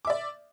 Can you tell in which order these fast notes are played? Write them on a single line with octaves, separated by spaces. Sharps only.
D6 E5 D5